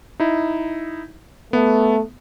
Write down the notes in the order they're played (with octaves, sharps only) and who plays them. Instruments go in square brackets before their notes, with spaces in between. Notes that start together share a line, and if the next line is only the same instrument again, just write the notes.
[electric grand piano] D#4 E4
[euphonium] A3 [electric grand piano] B3